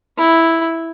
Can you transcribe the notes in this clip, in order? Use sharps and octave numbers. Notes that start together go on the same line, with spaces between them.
E4